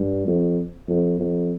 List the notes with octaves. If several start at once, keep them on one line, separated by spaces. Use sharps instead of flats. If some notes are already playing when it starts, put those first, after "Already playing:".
Already playing: G2
F2
F2
F2